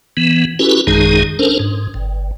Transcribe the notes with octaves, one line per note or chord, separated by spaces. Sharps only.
E3 B3
C#4 E4 F#4 G4 A4 B4
A1 F#2 D#3 G#3 D#4 G#4
C#4 D4 A4 A#4 C5
G#2
G1